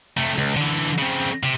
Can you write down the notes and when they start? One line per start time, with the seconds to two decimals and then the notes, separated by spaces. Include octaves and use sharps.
0.17 C3 A3
0.38 C#2
0.56 D3 E3
0.99 C#3 C4
1.43 C3